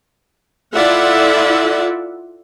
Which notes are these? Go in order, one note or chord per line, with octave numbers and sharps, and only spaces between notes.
E4 F4 A4 D5 E5 F#5